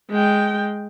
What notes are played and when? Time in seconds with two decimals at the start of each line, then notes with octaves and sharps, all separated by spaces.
0.11 G#3 G5